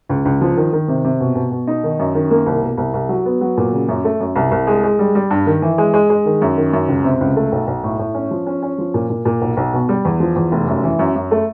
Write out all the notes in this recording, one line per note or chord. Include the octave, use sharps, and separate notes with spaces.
C#2
C#2
F3
D#3
D#3
C3
C3
B2
B2
B2
D#4
D#3
F#2
D#3
A#3
C2
B2
C2
C2
F#3
B3
F#3
A#2
C#3
F#2
A3
F#2
C2
C2
G#3
G#3
G3
G3
G2
D#3
E3
G#3
G#3
G#3
D#3
F#2
D#3
F#2
C#2
C3
C#2
A3
B1
B1
A2
A2
C#4
F3
C#4
C#4
F3
A#2
A#2
A#2
B1
B1
B2
G3
E2
F3
E2
F1
F#2
E3
F#2
F#2
A3